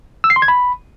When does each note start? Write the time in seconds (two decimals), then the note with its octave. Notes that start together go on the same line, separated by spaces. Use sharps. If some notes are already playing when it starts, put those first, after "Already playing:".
0.24 E6
0.30 C7
0.36 C6
0.42 G#6
0.48 B5